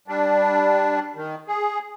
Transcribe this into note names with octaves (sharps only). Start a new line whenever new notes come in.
G3 D4
D#3
G#4